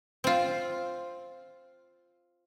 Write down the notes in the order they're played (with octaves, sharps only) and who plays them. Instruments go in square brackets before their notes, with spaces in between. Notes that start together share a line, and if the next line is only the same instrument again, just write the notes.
[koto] C4 F4